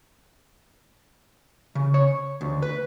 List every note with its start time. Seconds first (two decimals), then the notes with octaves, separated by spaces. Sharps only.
1.75 C#3
1.94 C#5
2.41 D2
2.62 B4